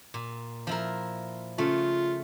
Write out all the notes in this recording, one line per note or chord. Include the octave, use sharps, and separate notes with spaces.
A#2
F3 E4 A#4
C#3 A3 F4